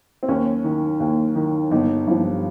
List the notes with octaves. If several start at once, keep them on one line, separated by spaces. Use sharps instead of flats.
C4
D#2 C#4
D#3
D#2
D#3
G1 D#4
G2 F3